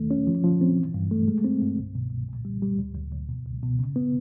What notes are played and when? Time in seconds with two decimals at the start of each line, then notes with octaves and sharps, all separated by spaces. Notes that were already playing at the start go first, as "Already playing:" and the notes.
Already playing: D#2 D#3 A3
0.11 C#4
0.27 F3
0.44 F3
0.61 C4
0.78 E3
0.94 G2
1.11 A3
1.28 G#3
1.44 C4
1.61 G2
1.78 C2
1.95 B2
2.11 C2
2.29 A#2
2.45 G3
2.62 G3
2.79 D2
2.95 D2
3.13 D2
3.29 B2
3.46 C#2
3.62 B2
3.79 C#3
3.96 B3